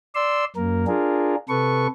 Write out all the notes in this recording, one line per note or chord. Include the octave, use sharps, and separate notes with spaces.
D5 C6 E6
F#2 A#3 A#4
D4 F4 G#4 A#4
C3 A4 B4 C#6